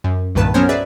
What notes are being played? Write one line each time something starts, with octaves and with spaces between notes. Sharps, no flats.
F#2
C2 G2 A#2 D#3 B4 A5
F#3 B3 C#4 A#4 C5 C#5
G#4 B4 D5 E5